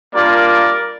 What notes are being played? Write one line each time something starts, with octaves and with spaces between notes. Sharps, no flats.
G3 A#3 D4 F4 A#4 D5